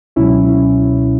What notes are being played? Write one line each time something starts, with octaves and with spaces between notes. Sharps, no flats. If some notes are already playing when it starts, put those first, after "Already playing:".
C#2 B2 F#3 C#4 E4